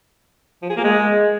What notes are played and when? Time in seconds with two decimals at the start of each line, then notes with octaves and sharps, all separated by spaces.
0.62 F3
0.69 G#4
0.77 A#3
0.84 G#3